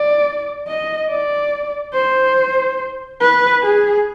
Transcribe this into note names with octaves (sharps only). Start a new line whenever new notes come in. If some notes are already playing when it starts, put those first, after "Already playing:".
Already playing: D5
D#5
D5
C5
B4
G#4